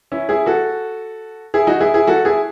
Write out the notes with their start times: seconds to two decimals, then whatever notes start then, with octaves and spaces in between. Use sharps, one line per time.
0.12 C#4 E4
0.29 E4 G#4
0.46 F#4 A4
1.54 E4 G#4
1.67 D#4 F#4
1.80 E4 G#4
1.94 E4 G#4
2.07 F#4 A4
2.25 E4 G#4